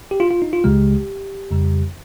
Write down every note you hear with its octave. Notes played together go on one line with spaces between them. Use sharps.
G4
F4
F4
D#4
F4
C#2 C#3 G#3 G4
F2 C#3 G3